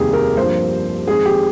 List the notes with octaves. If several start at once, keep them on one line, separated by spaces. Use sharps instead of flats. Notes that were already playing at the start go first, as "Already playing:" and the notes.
Already playing: F1 D#2 D#3 G3 A#3 G4 G#4
A#4
G2 F3 A#3 C5
F2 D#3 G#3 G#4
G4